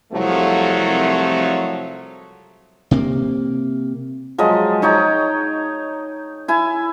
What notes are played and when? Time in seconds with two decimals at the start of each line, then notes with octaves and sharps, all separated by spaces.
0.13 C2 F3 F#3 A3
2.91 C3 A#3
4.38 F3 F#3 G#3 D#5
4.82 D#4 C#5 G5 A#5
6.48 E4 G#5